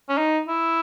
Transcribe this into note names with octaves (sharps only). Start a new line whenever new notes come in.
C#4
D#4
E4